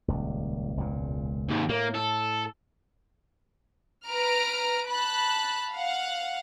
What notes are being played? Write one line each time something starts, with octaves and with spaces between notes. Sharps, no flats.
D#1 C#2
E1 C#2 A#2
D#2 G#2
A2 A#3
A4
B4 A#5 F6 D7
A5 B5 F#6
F5 F#5